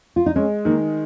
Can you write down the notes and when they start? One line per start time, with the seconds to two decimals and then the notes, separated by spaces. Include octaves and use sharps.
0.16 F4
0.26 D#4
0.36 G#3 C#4
0.65 D#3 A#3